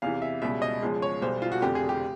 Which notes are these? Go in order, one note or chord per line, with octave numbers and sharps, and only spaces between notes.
E2 C3 E3 F5
E5
C#2 B2 G3 E5
D#5
E2 C#3 F3 G#3
C#5
B1 B2 G3 C5
F4
F#4
F1 F2 D3 G4
G#4
G4